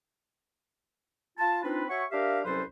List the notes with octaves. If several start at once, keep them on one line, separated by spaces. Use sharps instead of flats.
F4 A5
C4 D4 D#4 F4 B4
F#4 C#5 E5 F#5 G#5 C#6
D4 G4 A#4 E5 F5
C2 F#3 C#4 A4 B4 C5